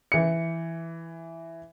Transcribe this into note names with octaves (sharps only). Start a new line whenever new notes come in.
E3 C#7